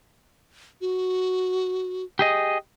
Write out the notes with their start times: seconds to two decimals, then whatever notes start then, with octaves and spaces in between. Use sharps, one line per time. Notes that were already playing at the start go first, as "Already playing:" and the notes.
0.81 F#4
2.19 G4 G#4 D#5